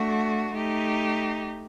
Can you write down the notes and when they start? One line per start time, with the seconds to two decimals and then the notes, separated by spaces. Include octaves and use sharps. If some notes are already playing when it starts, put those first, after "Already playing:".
Already playing: A3 D4 F#4
0.53 A3 D#4 G4